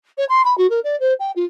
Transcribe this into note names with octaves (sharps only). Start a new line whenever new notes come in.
C#5
C6
B5
F#4
A#4
D5
C5
G5
F4